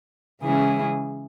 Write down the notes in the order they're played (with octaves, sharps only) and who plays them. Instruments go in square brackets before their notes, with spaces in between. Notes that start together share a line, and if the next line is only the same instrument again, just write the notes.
[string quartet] C#3 E3 G#3 C#4 E4 G#4